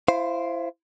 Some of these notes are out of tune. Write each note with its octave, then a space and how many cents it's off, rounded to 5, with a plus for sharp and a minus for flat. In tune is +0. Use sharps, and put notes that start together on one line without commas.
E4 +25 C5 +0 F5 +0